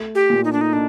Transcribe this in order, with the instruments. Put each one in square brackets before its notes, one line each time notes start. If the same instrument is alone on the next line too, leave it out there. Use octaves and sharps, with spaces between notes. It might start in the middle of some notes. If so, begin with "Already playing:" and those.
Already playing: [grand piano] A3
[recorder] G4
[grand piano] A#2
[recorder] D#4
D4
D#4
[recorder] D4 [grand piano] D#4